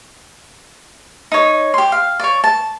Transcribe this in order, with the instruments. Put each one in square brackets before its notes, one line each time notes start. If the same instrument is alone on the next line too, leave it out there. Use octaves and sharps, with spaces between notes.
[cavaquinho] D#4 C#5
G4 C6
F5
C#5 D5
A5